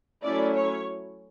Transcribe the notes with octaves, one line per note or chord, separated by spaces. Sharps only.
F#3 A3 C#4 E4 D5
C#5